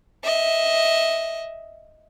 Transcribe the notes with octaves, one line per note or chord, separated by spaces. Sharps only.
D#5 E5